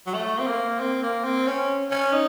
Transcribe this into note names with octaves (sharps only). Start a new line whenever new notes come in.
F#3
A3
C4
A#3
C4
A#3
C4
C#4
C#4
D#4